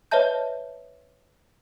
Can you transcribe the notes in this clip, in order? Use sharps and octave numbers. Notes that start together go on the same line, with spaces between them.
B4 C#5 D#5 E5 A5 G6